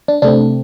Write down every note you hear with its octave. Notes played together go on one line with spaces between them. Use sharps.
D4
C3 A3 C4 D4